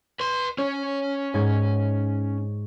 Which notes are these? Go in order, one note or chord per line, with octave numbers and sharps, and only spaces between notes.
B4 C6
C#4 C#5
G#2 C#5 G#6